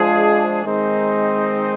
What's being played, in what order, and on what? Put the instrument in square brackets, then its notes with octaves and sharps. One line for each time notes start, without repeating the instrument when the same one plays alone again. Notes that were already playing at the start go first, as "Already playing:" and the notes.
Already playing: [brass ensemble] F3 G#3 D4 G#4
D#3 G#3 C4 D#4